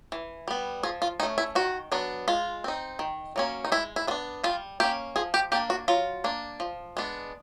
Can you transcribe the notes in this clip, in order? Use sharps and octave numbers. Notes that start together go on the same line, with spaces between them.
E3
G3 B3
F3 G#4
F4
A3 C#4 D#4
E4
D#3 F#4
F#3 B3 D4
G#3 F4
C4 D#4
D#3
F#3 A#3 C#4
D#4
G#3 E4
E4
B3 D4 F4
G3 F4
A#3 C#4 G4
F3 G#4
G4
A#3 D4 G4
F#4
F#3 F4
A#3 D4
F3
G#3 B3 D4